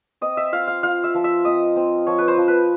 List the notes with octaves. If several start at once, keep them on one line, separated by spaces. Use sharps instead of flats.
C4 D#5
E5
F4 F5
F5
F4 F5
E5
F3
E5
C4 D#5
C4
F3 C#5
B4
C5
F3
B4